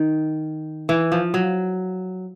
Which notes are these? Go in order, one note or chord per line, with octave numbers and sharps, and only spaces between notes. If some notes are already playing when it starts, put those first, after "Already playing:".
Already playing: D#3
E3
F3
F#3